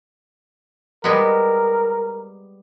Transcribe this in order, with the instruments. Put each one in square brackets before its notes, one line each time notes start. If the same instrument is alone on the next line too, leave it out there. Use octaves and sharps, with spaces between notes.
[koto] G3 G#3 B3 [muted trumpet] A#4